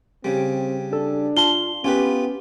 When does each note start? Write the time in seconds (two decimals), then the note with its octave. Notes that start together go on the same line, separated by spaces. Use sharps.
0.24 C#3 G3 C4
0.93 D4 A4
1.37 F4 A5 C6 G7
1.84 B3 C#4 F4 G4 B4